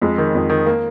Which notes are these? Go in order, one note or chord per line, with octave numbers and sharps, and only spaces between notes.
F2 G#3
D#3
F2
D#3
A#3